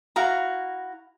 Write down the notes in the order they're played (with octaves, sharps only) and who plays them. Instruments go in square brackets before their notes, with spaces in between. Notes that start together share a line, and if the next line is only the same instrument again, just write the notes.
[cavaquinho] E4 F#4 F5 A#5